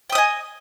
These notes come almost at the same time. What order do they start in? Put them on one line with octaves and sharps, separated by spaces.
G5 D#6 D#5 G#5